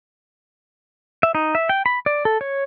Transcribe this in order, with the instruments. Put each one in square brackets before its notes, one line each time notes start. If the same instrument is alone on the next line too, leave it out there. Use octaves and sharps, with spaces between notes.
[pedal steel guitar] E5
D#4
E5
G5
B5
D5
A4
C#5